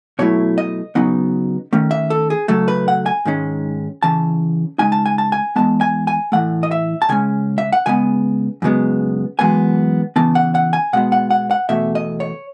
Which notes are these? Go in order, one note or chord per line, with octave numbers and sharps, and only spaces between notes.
B2 F#3 A3 E4 C#5
D#5
C#3 F#3 B3 D#4
D#3 A3 C#4
E5
A4
G#4
C#3 F#3 A3 A4
B4
F#5
G#5
G#2 D#3 G#3 C#4
C#3 E3 A5
C#3 G#3 D#4 G#5
A5
G#5
A5
G#5
E2 C#3 G#3 B3 A5
G#5
G#5
A2 E3 A3 F#5
D#5
E5
A5
C#3 G#3 C#4 G#5
E5
F#5
C#3 G#3 B3 G#5
F#2 C#3 G#3 B3
F#2 E3 G#3 B3 G#5
C#3 E3 B3 A5
F#5
F#5
G#5
B2 G#3 B3 F#5
F#5
F#5
F#5
E2 B2 A3 E5
D#5
C#5